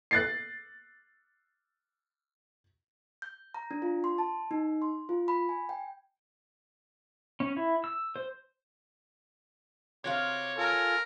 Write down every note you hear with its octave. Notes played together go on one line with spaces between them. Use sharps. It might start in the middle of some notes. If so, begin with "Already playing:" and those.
F#6 A6 C7
G6
A#5
D4
F4
C6
A5
D#4
C6
F4
B5
G#5
G5
C#4
E4
E6
C5
C3 F#3 C#5 F5 C6 D6
F4 A4 A#4 G#5